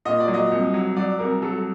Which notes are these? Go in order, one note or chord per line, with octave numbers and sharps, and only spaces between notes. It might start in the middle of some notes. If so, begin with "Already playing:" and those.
A#2 D#5
D5
F#3
D#5
C2
F#3
F#3 D5
C2 A#4
F#3 A4